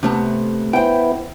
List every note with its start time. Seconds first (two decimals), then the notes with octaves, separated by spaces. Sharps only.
0.03 C3 A3 B3
0.73 B3 E4 C5 G5